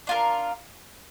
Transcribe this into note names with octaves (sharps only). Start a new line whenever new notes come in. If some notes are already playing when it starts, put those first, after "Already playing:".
D4 F4 A#4